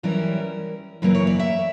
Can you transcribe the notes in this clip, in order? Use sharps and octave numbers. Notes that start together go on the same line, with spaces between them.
F#2 E3 G3 C#4 E4 A#4
F#2 C#3 E3 A#3 E4 B4
C#5
D5
E5